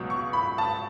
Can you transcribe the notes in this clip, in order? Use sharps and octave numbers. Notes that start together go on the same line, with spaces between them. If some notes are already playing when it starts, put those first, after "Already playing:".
Already playing: C#2 B2 F#3
C#6
B5
A5